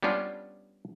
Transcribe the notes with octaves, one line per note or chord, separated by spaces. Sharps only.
G3 B3 C#4 D4 F4